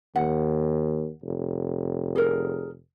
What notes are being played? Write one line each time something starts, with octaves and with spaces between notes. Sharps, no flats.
D#2 F#5
F1
G#4 A#4